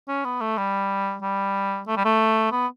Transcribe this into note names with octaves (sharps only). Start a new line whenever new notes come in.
C#4
B3
A3
G3
G3
A3
G3
A3
B3